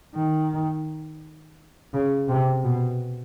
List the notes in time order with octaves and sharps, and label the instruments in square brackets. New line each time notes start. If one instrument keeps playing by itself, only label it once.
[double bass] D#3
C#3
C3
B2